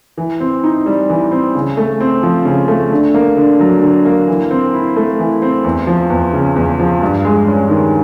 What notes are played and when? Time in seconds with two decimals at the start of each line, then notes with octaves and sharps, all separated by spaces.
0.18 E3
0.40 C4
0.64 D#4
0.86 G3
1.10 E3
1.32 C4
1.55 C#3
1.77 A3
2.00 C4
2.23 F3
2.45 C#3
2.68 A3
2.92 D3
3.14 A#3
3.37 D3
3.60 F#3
3.82 D3
4.05 A#3
4.27 E3
4.51 C4
4.73 E4
4.96 A3
5.19 E3
5.42 C4
5.64 E2
5.87 F3
6.10 E2
6.33 C#3
6.56 E2
6.79 F3
7.02 G2
7.25 G#3
7.48 C#4
7.70 D#3